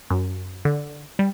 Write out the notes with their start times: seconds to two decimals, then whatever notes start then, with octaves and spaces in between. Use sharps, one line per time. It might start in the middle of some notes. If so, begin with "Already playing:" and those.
0.11 F#2
0.65 D3
1.19 G3